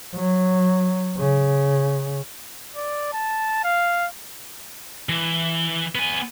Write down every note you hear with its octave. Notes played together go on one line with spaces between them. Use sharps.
F#3
C#3
D5
A5
F5
E3
B3 G#5